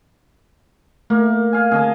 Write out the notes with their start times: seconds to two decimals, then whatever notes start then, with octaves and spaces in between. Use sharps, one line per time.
1.10 A3 A#3
1.53 F5 G#5
1.71 D3 C4 G#4 D#5 A5